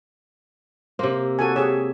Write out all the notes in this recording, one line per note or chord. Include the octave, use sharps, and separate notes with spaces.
C3 A#3 C5
F#4 A4 G#5
G4 G#4 C#5 E5